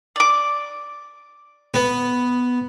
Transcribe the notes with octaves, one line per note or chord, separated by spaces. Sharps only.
D5 D6
B3